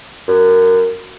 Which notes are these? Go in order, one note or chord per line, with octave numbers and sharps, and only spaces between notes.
F#2